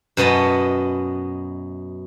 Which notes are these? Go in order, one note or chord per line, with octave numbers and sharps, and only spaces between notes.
F#2 B2 B3 D#5 A5